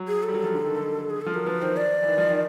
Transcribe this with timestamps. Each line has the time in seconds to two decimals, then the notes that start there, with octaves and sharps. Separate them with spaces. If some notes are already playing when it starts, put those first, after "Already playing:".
Already playing: F#3
0.08 G#4
0.23 A4
0.28 G3
0.34 F#3
0.44 F3
0.54 D3
0.64 D#3
0.75 D3
0.84 D#3
1.10 G#4
1.21 A4
1.26 F3
1.34 F#3 A#4
1.46 F3 B4
1.61 D#3 C5
1.77 D5
2.03 E3
2.07 D#3
2.18 F3
2.29 D#3